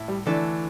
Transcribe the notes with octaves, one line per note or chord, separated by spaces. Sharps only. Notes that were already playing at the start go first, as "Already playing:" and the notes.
Already playing: A2 E4
G3
D3 E3 A3 D4 A4